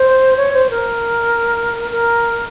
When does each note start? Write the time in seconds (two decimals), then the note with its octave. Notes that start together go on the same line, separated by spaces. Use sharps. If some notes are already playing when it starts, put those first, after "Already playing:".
Already playing: C5
0.36 C#5
0.53 C5
0.70 A#4
1.91 A#4